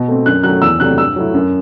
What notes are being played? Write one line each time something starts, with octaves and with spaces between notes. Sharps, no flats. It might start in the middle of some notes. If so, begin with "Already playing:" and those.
Already playing: B2
A3 C4
F#2 F#6
F#3 A3 F#6
E2 E6
C3 F#3 A3 D4 F#6
G2 E6
F#3 A3 E4
F#2